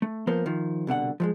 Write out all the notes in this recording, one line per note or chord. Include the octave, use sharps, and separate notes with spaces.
A3
F3 A#3 B3 A#4 C5
D#3 F3
C2 B2 D3 F#5
F3 F#3 G#3